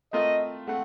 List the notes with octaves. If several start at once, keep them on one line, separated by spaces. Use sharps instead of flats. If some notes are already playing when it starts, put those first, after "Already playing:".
A3 C4 F4 A#4 D#5
A3 C4 F#5